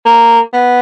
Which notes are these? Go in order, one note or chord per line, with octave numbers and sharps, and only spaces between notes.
A#3
B3